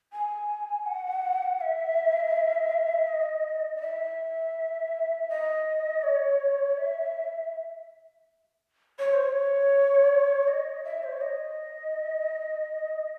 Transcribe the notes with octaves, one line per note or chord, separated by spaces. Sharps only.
G#5
F#5
E5
D#5
D#5
E5
D#5
C#5
E5
C#5
C5
C#5
D#5
E5
C5
C#5
D#5